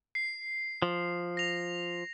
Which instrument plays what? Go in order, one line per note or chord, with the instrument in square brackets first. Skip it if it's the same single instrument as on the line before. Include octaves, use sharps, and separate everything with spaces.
[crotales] C7
[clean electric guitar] F3
[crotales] A#6 F7